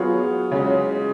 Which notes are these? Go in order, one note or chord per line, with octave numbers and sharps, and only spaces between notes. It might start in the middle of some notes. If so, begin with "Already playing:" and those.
Already playing: F#3 B3 F4 G#4 C#5
C#3 G#3 C#4